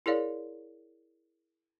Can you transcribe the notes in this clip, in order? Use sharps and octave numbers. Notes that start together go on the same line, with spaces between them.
E4 G#4 A#4 C#5 D5 F5